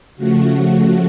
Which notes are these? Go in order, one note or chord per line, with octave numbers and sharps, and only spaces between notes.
C#3 F3 A3 F#4